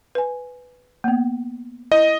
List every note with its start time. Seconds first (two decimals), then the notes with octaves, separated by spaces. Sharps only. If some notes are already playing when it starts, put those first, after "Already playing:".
0.15 B4 G#5
1.04 A#3 B3
1.92 E4 D#5